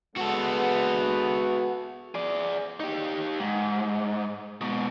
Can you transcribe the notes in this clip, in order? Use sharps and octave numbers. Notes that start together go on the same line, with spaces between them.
G#3 B3 F#4 A4
G#4 D5
D#4 G4
G#2
G#2 B2